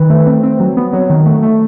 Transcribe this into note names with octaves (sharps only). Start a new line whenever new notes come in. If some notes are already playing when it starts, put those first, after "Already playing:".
Already playing: D#3 B4
A3
C4
C4
F#3
B3
F#3
D#3
A3
A3